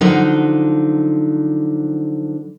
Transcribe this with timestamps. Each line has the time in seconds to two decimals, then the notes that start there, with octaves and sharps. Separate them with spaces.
0.01 D3 F3 F#3 D#4